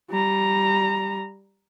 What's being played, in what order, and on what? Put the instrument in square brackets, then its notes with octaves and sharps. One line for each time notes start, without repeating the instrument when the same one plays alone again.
[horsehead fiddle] G3 A#5